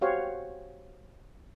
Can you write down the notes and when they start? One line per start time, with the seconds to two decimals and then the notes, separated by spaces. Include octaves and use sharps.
0.01 F#4 G4 C5 C#5 F5 F#5